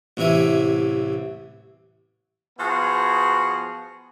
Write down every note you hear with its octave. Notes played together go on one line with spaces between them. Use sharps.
A1 C3 E3 E5 G#5
F3 B3 F#4 G#4